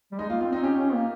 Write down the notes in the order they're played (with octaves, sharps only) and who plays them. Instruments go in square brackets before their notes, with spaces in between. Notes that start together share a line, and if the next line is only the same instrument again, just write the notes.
[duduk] G3
[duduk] G#3 [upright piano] D#4
[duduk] A#3 [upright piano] F4
[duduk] C4 [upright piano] F4
[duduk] C4 [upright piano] D#4
[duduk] C#4 [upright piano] G4
[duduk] C#4
A#3